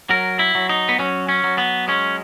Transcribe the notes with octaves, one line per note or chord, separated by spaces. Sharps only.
F#3 A#4
E4
F#3
D#4
B3
F#3 C#4
C#4
F#3
B3
G#3 C#4